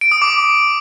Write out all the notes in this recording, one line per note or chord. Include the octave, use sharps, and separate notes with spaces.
D7
D#6
D6